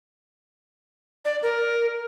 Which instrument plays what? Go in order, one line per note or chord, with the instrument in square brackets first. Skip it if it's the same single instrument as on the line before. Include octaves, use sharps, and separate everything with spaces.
[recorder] D5
A#4